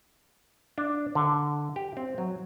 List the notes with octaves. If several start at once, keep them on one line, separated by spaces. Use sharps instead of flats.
D4
D3
G4
C4
F#3